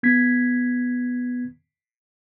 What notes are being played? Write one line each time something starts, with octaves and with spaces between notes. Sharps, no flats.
B3 G#6 B6